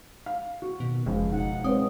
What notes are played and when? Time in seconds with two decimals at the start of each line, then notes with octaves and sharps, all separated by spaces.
0.26 F5
0.62 F#4
0.80 B2 D#3
1.06 F1 C#2 F3
1.32 B2 D#4 F#5
1.64 G#3 C4 B4 C#5 D#6